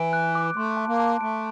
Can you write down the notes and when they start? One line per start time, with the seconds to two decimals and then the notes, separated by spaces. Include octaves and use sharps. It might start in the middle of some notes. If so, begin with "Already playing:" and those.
Already playing: E3 D7
0.13 F#6
0.35 D6
0.56 A3 C6
0.77 A5
0.88 A#3
0.99 A5
1.21 A3 D7